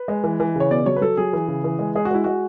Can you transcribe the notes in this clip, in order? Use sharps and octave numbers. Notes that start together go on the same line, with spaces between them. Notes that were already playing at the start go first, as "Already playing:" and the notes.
Already playing: B4
G#3
E3
E3
C#3 C#5
B2 D5
F#3 C#5
B4
F#3 A4
F#3 G#4
E3
C#3
E3
G#3
G#3 G#4
F#4
G#3 E4
G#3 F#4